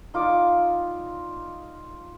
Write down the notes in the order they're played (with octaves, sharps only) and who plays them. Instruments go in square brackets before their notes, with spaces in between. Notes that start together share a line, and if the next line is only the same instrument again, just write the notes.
[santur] D#4 F4 D5 D6